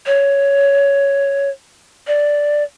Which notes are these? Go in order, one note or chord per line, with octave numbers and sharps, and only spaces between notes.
C#5
D5